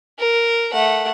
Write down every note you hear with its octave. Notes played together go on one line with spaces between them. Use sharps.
A#4
A3 F#5